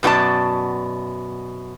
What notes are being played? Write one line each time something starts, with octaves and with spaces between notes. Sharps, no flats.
F#2 B2 F#4 D5 A5